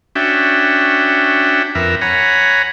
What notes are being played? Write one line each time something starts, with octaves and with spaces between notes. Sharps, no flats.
C#4 D4 F#4 E5 G5
F2 A#4 B4 E5
C#5 F#5 G#5 A#5 B5